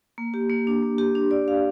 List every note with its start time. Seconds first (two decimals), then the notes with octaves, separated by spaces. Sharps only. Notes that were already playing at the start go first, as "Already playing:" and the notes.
0.18 A#3
0.34 G4
0.50 A#3
0.67 D4
0.83 A#3
0.98 G4
1.15 D4
1.31 D5
1.48 F5